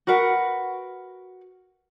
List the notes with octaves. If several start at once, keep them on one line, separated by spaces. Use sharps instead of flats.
F#4 A#4 B4 F#5